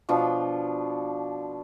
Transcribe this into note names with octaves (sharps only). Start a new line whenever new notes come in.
B2 F3 D4 F4